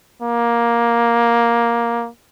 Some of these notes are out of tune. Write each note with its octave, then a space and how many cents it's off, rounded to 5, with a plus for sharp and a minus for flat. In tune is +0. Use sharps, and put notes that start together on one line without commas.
A#3 +10